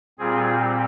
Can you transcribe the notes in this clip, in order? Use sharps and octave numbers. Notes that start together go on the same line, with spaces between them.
A#2 G3 C4 F4 G#4